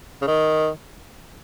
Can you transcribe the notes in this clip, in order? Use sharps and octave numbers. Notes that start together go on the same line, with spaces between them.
C#3
D#3